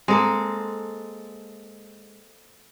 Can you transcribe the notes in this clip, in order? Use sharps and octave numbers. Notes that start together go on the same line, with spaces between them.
G#3 A#3 C4 A4